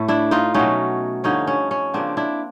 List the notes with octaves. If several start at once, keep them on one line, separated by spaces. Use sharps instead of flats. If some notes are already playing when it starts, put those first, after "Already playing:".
Already playing: A2 A3
D4 E4
D#4 F4
B2 F#3 A3 C#4 D#4
G2 D3 F3 C#4 D#4
C#4
C#4
C#3 F3 A#3 C4 D4
D4 E4